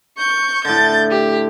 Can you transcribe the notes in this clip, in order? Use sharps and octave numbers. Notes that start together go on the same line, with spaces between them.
C#6 G6
A2 D3 G6 A6
G4